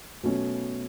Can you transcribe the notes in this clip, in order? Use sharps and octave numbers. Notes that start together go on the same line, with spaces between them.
B2 F#3 A3 C#4